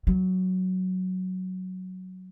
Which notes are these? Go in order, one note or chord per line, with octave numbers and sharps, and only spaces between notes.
F#3